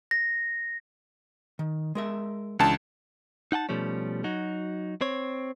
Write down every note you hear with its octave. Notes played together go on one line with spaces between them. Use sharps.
A#6
D#3
G#3 A#4 E5
C#2 E3 C#4 D4 A5
D#4 F#5 G5 A5
B2 F3 G3 A3 C#4
F#3 D#4 F#4
C4 C#5